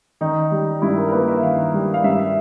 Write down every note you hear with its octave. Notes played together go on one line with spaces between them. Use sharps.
D#3 D#4
G3
G2 E4
A#4
A#4
A#3 B4
E5
D#3 F5
G3
F5
G2 E5
E5